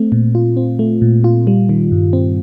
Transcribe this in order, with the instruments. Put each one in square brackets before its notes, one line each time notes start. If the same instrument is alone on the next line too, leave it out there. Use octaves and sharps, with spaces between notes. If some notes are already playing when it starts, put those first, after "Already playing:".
Already playing: [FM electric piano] A3 C4
A#2
F4
C4
A3
A#2
F4
G3
D#3
G2
C4